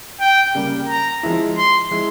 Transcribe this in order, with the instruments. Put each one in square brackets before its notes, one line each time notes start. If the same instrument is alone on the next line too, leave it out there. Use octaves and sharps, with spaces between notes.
[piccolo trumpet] G5
[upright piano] C#3 G3 A#3
[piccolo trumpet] A#5
[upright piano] F3 G#3 E4
[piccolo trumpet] C6
[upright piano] F3 G#3 E4